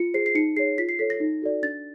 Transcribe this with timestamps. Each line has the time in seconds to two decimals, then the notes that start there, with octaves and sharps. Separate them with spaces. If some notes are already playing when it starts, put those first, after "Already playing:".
Already playing: F4 C#7
0.14 G#4 C5 C7
0.26 C7
0.35 D#4 C#7
0.56 G#4 C#5 C7
0.78 F4 B6
0.89 C7
0.99 A4 C#5 B6
1.10 A#6
1.20 D#4
1.42 F#4 A4 D5
1.63 D4 A6